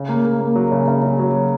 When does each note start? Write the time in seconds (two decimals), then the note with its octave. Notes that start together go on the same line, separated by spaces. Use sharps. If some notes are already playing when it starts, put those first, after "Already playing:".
Already playing: C#3
0.09 A#3
0.25 A#3
0.40 A#3
0.55 F#3
0.72 C#3
0.88 C#3
1.02 C#3
1.19 F#3